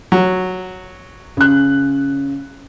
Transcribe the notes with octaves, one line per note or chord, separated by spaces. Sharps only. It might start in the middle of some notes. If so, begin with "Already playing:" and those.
F#3
C#3 F#6